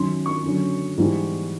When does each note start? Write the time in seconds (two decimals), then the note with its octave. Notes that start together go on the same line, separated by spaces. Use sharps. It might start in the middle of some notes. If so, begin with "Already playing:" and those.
Already playing: F#2 D#3 F#3 C6
0.26 C#6
0.44 F#2 D3 F#3
0.98 G#2 E3 G3